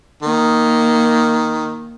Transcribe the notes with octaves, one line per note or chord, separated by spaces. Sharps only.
D#3 A#3